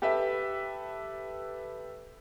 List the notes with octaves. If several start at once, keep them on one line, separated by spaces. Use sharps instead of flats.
G4 A4 B4 E5